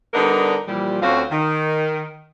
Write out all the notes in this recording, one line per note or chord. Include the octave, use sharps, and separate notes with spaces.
D3 G3 B3 D4 D#4 A#4
A#2 E3 F3 G3
D2 C4 C#4 F4 F#4 F5
D#3